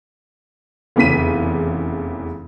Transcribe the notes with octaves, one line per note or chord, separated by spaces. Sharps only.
F1 E2 C#3 B6 D#7